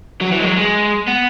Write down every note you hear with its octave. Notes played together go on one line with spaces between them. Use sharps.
F#3
E3
G#3
F#3
G#3
B3